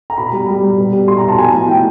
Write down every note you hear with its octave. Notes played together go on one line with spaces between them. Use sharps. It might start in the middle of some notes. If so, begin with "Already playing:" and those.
A#5
B2 B5
G3
G3
G3
B2
G3
B2 C6
A#5
B2
A5
F3 G#5
A2
A2 G5